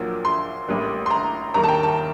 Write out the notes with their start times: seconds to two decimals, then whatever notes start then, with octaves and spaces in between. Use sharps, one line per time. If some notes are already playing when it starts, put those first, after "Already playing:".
Already playing: A#1 A#2 F#3 A#3
0.25 C6
0.68 A1 A2 G3 A#3
1.06 C6
1.10 A#5
1.54 D#2 D#3 G3 A#3 A#5
1.63 A5
1.68 G5
1.83 A5